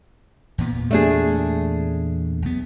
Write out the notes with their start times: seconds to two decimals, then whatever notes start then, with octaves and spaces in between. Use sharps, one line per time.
0.58 E2 A#2 B3
0.91 A3 D4 G#4
2.42 B1 B3